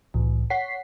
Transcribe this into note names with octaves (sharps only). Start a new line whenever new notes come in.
C2 A2 E3
C#5 F#5 B6 C7